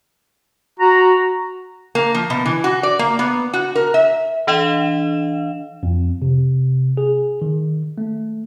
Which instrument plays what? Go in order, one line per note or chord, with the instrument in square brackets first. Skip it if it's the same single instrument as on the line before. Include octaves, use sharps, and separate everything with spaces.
[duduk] F#4 [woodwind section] A#5
[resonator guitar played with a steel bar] A#3
F3
B2
E3
F#4
D5
A#3
B3
F#4
A#4
E5
[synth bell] E3 D4 D#5 F5 E7
[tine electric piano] F2
C3
G#4
D#3
A3